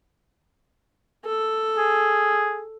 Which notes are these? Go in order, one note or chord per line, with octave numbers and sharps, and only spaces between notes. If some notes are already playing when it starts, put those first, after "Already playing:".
A4
G#4